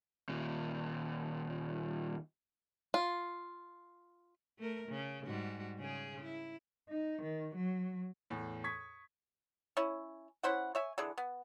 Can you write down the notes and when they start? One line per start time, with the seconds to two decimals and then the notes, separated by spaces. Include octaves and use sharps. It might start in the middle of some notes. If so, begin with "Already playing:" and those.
0.29 D#2 A#2
2.94 F4
4.58 A3 A#4
4.89 C#3
5.25 G#2 G3 F#4
5.79 C#3 G#4
6.23 E4
6.90 D#4
7.23 D#3
7.56 F#3
8.30 E2 A2
8.64 C#6 D#6 G#6 B6
9.77 C#4 E4
10.43 C#4 E4 C5 F#5
10.75 C#5 E5 G#5
10.98 D3 E3 G#4
11.18 B3